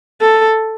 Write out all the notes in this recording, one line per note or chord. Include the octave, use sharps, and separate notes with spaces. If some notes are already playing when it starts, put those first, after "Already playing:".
A4